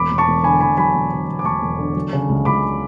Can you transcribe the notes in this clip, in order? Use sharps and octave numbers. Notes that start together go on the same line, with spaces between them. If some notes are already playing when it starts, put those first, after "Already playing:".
Already playing: E1 B5 D6
E1
A5 C#6
E1
D3 G#5 B5
E1 G#5 B5
F#3 G#5 B5
E1
D3
E1
D6
E1 A5 C#6
E1
D3
F#3
C#3
C#2
C#2 B5 D6